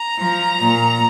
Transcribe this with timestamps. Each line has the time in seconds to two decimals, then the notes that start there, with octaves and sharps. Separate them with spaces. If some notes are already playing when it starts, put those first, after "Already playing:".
Already playing: A#5
0.18 F3
0.61 A#2